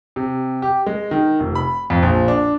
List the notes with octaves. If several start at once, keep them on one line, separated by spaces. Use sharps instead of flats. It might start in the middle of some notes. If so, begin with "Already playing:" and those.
C3
G4
G#3
D#3
F1
B5
F2
A#1
D4